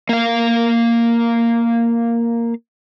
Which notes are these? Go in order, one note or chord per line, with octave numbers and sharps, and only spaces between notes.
A#3 F5